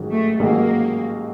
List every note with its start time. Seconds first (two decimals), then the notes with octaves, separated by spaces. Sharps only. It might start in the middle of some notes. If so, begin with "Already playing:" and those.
Already playing: A1 G#2 D#3 F#3
0.11 A3
0.40 A1 G#2 D#3 F#3 A#3